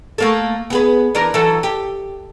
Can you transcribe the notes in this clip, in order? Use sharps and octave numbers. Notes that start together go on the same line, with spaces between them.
A3 A#3 A4
B3 G#4 B4
E3 D4 A#4
E3 F#3 A4
G4